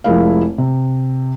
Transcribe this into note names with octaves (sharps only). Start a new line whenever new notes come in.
F1 F3 G#3 E4 A#4 F5
C3